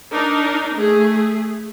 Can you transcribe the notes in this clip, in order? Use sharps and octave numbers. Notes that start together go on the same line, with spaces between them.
D4 D#4 A#4
A3 G#4